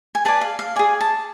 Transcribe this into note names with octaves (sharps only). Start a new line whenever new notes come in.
G#5
G#4 B4 D5 A5
F5
F5
G#4 D5 G#5
A5